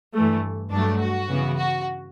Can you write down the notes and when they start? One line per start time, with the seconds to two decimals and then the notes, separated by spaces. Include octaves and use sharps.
0.14 G2 E3 A3
0.71 G2 F#3 A3 D4
1.00 F#4
1.28 C#3 E3 B3
1.57 F#4